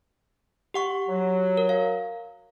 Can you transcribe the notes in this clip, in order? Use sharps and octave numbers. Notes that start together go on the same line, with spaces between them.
G4 F#5 C#6
F#3
A#4
F5